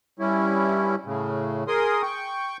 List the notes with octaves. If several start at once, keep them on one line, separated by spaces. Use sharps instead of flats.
G2 G3 C#4 E4
A2 C#3
G#4 A#4 C6 D#6
G5 C#6